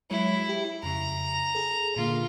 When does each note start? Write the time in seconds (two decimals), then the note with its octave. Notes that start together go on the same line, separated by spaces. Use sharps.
0.10 F#3 G#3 E4 C#5
0.49 G4
0.83 F2 C#3 A#5
1.55 G#4 A4
1.96 A#2 D3 A#3 F4